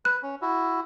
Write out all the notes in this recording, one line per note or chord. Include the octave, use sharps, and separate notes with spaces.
B4 F#6
C#4
E4 F#4